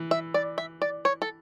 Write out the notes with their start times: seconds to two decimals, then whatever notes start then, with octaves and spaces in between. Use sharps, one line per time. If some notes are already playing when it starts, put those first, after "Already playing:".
Already playing: E3
0.11 E5
0.34 D5
0.58 E5
0.82 D5
1.05 C#5
1.22 A4